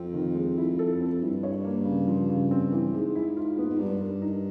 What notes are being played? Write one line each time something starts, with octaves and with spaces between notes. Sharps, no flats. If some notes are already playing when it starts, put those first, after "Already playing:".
Already playing: F2 C4
D#3
G#3
E4
A4
C4
G2 E4
C#5
A#3
C#3
F3
C#3
C4
E3
G#2 G#3
E4
F4
B3
G#2
G2 D4
A#4
D#4